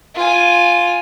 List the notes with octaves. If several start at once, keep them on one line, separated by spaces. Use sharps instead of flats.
F4 G#5